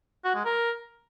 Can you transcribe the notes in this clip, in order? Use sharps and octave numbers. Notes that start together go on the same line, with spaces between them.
F#4
G#3
A#4